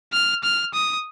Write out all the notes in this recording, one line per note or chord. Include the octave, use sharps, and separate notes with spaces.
F6
F6
D#6